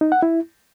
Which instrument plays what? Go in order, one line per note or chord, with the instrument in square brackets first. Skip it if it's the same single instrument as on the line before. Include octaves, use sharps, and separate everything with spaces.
[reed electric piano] D#4
F#5
E4